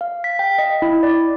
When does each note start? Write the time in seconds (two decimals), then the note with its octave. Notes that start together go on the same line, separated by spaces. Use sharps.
0.01 F5
0.24 B6
0.39 G5
0.59 D#5
0.82 E4
1.03 D5